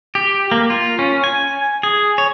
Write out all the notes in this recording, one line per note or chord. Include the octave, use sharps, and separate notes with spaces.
G4
A#3
F4
C#4
G#5
G#4
C#5